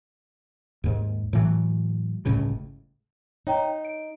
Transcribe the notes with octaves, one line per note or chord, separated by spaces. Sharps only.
D#2 G#2
A2 E3 F#3
G1 C#2 A2 C#3
D#4 C#5 G5 A#5
D7